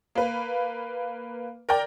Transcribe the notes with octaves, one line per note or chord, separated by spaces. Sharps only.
A#3 B4
A#4 D5 G5